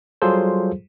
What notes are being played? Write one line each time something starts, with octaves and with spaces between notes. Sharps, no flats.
F#3 G3 F4 G#4 A4 C5